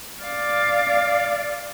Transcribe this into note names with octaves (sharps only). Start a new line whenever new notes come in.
D5 F5